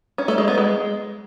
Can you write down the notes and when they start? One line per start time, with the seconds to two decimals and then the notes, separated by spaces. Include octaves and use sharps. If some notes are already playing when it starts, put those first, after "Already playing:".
0.18 C#4
0.28 A3
0.38 G#3
0.48 B3
0.58 G#3